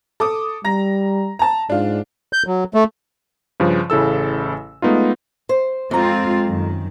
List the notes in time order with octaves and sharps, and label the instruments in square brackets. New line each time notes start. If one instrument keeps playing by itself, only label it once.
[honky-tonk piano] A4 D6 D#6
[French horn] G3 [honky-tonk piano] A#5 A#6
[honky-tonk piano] A5 A#5
[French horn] G#2 [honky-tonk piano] D4 F4
[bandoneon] G6
F#3
A3
[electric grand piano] G2 C#3 F3
A1 C#3 E4 A4 E6
G#3 A3 B3 D#4 F4
[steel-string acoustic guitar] C5
[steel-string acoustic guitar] F2 A#5 [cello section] G#3 C4 F4
[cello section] F#2 D#3